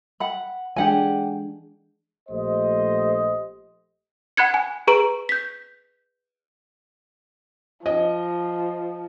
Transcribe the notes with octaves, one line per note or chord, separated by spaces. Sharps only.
F#5 B5
E3 G#3 D4 G4 F#5 G#5
A#1 A3 G4 C5 D#5
F#5 B5 F#6 G#6 C#7
G#5
G#4 B4 A#5 C#6 D7
G6 B6
F3 D#5